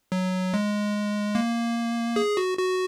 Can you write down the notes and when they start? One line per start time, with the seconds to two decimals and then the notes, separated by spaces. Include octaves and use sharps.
0.12 F#3
0.54 G#3
1.35 A#3
2.16 G#4
2.37 F#4
2.58 F#4